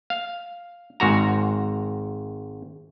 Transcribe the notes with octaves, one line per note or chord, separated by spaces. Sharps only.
F5
G#1 G#2 F#4 A#5